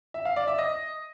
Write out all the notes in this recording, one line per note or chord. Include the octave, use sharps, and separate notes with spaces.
E5
F5
D5
E5
D#5